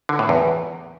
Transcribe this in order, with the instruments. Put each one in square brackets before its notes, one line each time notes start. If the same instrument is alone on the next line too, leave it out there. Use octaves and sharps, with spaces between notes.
[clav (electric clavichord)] D3
A2
E2